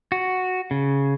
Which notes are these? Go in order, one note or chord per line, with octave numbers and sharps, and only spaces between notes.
F#4
C#3